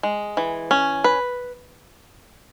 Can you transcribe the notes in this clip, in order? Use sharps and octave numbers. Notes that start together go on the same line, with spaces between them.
G#3
E3
C#4
B4